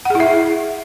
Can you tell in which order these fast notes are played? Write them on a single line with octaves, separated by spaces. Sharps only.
F#5 G#4 E4 E5